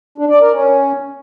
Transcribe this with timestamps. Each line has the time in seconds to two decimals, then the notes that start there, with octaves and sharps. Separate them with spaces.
0.18 D4
0.29 D5
0.41 A#4
0.52 C#4